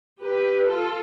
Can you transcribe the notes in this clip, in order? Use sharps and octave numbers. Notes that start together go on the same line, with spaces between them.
G4 B4
F4 A4